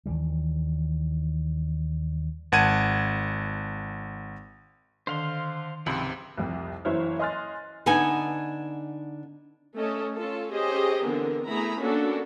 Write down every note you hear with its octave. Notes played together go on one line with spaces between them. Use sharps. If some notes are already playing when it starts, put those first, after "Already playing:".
D#2 D#3 E3 G3
G#1 F#5 A5 G#6 D#7
D3 D#3 C5 F5 C6
C#2 G#2 C3 F3 E4 B5
C2 F2
F#1 E3 E4 C5 C#5 F6
D#5 G#5 C6 F6 F#6 A6
D3 B3 D4 D#4 G#5
A3 C#4 A4 D#5
C#4 F4 A4
C#4 G4 G#4 C5 D#5
D3 E3 B3 C4 A#4
A3 B3 E4 G#4 A#5 B5
A#3 C#4 D4 F#4 A4